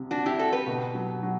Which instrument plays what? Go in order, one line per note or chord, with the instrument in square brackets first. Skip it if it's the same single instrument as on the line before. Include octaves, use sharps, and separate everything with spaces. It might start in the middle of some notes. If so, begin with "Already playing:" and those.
Already playing: [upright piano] C2 C3
[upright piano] C3 [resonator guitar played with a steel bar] D4 F#4
[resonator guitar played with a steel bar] E4 G4
[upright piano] D4 [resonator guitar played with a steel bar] F#4 A4
[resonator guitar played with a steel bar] G4 B4
[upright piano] B2
F#3
F#3